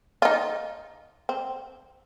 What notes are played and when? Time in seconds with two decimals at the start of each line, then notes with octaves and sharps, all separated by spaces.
0.22 F4
0.25 D#4
1.29 C4